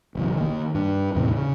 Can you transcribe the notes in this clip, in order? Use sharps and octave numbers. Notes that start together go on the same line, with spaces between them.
F#1 B1 E3
D#3 A#3
G2 D4
E2 A2 C3
C#3